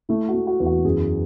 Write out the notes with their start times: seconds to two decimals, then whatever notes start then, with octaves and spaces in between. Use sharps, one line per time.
0.09 A3 E4
0.29 F#4
0.34 A3
0.47 F#4
0.60 E2
0.66 F#4
0.84 F#2 G#4